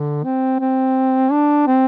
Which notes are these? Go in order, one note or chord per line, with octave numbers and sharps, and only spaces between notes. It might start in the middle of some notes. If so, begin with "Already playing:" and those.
Already playing: D3
C4
C4
D4
C4